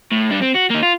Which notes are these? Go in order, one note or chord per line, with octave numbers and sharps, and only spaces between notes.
A2
G2 D4
C4
F#4
A#3 D#4
F4